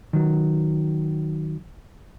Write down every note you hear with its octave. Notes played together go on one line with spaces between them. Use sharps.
D#3 F#3